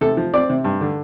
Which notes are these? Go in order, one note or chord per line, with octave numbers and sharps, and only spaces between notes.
C3 A4
F3
C4 D5
C3
G2
D3